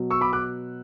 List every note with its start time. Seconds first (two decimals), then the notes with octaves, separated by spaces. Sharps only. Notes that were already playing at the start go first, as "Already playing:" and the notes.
Already playing: B2 F#3
0.11 C#6 E6
0.21 B5 D6
0.33 D6 F#6